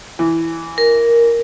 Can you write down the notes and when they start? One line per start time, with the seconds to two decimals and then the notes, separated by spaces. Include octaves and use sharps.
0.19 E3
0.78 A#4